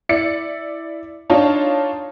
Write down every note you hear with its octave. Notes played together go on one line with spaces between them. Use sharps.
E4 D5 C#7
D4 D#4 F4 C#5 A5